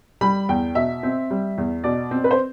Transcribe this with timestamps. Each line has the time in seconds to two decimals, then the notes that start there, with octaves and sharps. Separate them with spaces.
0.21 G3 B5
0.49 E2 G5
0.75 B2 E5
1.03 C4
1.31 G3
1.58 E2
1.84 B2 D5
2.11 C4
2.24 B4
2.31 C5